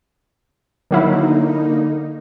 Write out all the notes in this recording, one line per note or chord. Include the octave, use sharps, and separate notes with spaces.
D3 D#3 F#3 A#3 D#4 E4